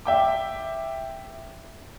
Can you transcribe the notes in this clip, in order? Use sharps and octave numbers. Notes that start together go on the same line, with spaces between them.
E5 G5 D6